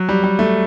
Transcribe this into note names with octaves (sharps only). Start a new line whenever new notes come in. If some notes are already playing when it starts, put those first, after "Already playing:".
Already playing: F#3
G3
G3
A3